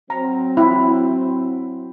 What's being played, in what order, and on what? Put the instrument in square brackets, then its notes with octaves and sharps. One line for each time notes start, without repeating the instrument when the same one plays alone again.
[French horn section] F#3 C4 [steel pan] A#5
[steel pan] E4